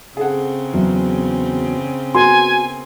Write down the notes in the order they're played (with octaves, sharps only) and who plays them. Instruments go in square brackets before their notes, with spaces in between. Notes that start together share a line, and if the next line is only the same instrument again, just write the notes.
[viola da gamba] C#3 C4 [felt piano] G#4 A4 F#5
[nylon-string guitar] E2 F#3
[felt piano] B3 A#4 C6 [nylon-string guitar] F#4 [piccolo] G#5